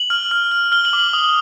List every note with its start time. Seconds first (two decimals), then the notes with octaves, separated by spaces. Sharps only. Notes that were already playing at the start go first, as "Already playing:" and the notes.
Already playing: F#7
0.10 F6
0.31 F6
0.52 F6
0.72 F6 G7
0.85 F#7
0.93 D6
1.00 F#7
1.13 D#6